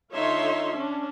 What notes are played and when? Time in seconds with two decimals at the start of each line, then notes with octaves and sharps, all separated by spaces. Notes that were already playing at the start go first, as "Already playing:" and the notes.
0.13 D3 D#4 F4 C#5 E5 C6
0.75 C#4 D4